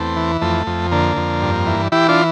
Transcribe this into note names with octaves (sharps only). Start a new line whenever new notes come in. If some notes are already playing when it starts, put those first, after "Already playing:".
Already playing: E2 A3 C4
E3
F2 A3
F2
D3 A#3
F2
G2
E3
E3 E4 G4
D4 F4